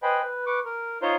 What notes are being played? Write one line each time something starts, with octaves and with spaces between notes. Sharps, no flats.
B4 C5 D#5 G5 G#5 B5
B4
B4 C#6 D6
A#4
D#4 F4 C5 C#5 A#5 C6